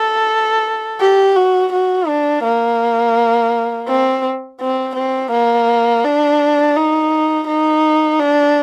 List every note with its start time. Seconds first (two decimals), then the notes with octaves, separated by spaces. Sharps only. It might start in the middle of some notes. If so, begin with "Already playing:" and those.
Already playing: A4
1.00 G4
1.36 F#4
1.73 F#4
2.08 D4
2.44 A#3
3.88 C4
4.61 C4
4.96 C4
5.31 A#3
6.04 D4
6.76 D#4
7.47 D#4
8.20 D4